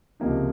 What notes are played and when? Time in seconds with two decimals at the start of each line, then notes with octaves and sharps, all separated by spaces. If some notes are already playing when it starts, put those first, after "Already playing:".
0.20 C#2 C3 F3 A#3 D#4